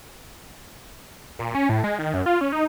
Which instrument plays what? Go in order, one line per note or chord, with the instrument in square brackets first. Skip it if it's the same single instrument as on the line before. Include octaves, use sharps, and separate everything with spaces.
[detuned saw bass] A#2
C#4
A2
G#3
D#3
F#2
F4
C#4
D#4